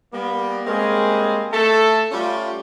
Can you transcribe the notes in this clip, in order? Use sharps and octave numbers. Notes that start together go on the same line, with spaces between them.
G3 A#3 B3
G3 G#3 A#3 C4 C#4 G#4
A3 A4
G3 A3 C#4 F4